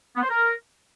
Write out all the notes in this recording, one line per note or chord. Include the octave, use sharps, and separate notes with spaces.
B3
C5
A#4